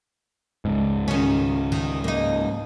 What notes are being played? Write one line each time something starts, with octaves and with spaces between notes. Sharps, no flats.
C#2 G#2
D#3 C#4
D#3
A#3 D#4